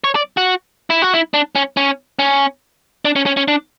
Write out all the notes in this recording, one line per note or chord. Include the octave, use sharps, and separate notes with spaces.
C#5
D5
F#4
E4
F#4
E4
D4
C#4
C#4
C#4
D4
C#4
C#4
C#4
D4